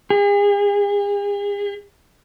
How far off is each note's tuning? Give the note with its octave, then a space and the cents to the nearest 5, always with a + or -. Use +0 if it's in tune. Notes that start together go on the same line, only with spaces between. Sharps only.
G#4 -40